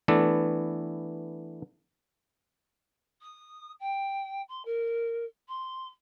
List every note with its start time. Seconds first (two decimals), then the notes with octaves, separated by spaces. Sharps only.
0.08 E3 A3 B3 D4 A4
3.20 D#6
3.79 G5
4.48 C6
4.65 A#4
5.48 C6